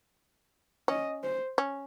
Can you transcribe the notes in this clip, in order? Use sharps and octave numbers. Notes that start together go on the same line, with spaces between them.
C#4 D#5
C5
C#4